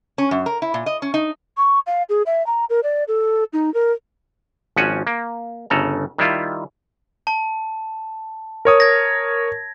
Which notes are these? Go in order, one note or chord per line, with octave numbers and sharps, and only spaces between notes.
C#4
F#2
A#4
E4
A#2
D#5
C#4
D#4
C#6
F5
G#4
E5
A#5
A#4
D5
A4
D#4
A#4
G#1 F3 C#4 F#4 F#5 G#5
A#3
G1 C#3 A4 A#5
D#3 G3 E4 F4
A5
A#4 C#5 D#6
G#6 A#6